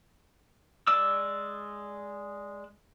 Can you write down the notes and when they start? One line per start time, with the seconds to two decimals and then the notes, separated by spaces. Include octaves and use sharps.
0.87 G#3 D5 D6 E6